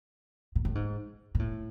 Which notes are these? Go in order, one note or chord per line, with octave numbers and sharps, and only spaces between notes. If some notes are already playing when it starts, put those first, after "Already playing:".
A#2
A2
G#2
A#2
A2